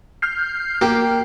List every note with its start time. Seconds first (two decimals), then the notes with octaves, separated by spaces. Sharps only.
0.22 F6 G6 C7
0.81 A#3 G4